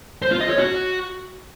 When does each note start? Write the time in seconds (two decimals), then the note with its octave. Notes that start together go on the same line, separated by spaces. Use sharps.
0.22 C5
0.31 F4
0.41 D#5
0.50 C#5
0.59 F#4